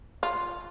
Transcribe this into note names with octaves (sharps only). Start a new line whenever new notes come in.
F4